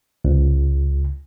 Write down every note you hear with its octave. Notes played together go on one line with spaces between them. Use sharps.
C#2